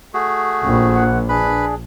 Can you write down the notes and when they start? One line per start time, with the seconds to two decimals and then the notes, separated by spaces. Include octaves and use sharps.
0.14 A3 F#4 G#4
0.64 A#1 D#2 G3 C4
0.95 F#5
1.29 D4 G#4 B4 B5